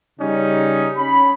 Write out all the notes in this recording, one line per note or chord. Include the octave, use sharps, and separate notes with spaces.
C#3 G3 C#4 D#4
C#4 B5